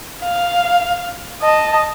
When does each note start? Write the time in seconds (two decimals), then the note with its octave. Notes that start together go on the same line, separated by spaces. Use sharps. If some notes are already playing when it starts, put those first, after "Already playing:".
0.23 F5
1.42 D#5 A5